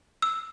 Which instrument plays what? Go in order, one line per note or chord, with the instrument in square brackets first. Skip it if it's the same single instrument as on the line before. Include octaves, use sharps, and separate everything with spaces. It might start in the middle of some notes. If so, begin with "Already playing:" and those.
[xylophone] E6